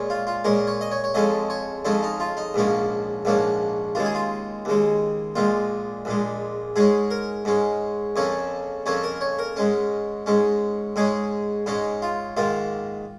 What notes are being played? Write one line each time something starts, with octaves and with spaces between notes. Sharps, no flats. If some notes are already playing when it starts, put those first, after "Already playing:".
Already playing: A#2 G#3 C#4
F4
F4
A#2 G#3 C#4 A#4
C#5
D#5
C#5
C#5
F2 F3 G#3 C#4 D#5
C#5
F2 F3 G#3 C#4 D#4
D#4
F4
D#4
A#1 G#2 F3 A#3 C#4
A#1 G#2 F3 A#3 C#4
D#2 C#3 G#3 F4
G#4
F4
D#2 C#3 G#3
A#1 A#2 G#3 F4
A#1 A#2 G#3
G#2 G#3 C#4 G#4
A#4
G#2 G#3 C#4
F2 C#3 A#3 C#4 C#5
F2 C#3 A#3 C#4 C#5
A#4
C#5
A#4
G#2 G#3 C#4
G#2 G#3 C#4
G#2 G#3 C#4 G#4
G#2 G#3 C#4 D#4
F4
G#2 D#3 A#3 F4